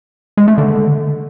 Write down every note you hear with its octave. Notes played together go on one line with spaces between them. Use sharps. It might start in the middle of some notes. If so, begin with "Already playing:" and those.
G#3
A3
D3